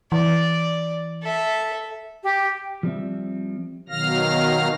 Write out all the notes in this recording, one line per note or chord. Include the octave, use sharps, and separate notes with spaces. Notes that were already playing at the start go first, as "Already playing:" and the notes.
E3 D5
A4 E5
G4
F3 G3 C4 E5
B2 D#3 F#3 F5 F6 A#6